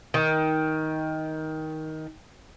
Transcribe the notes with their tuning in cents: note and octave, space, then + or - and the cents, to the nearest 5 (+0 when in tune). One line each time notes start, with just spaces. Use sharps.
D#3 +15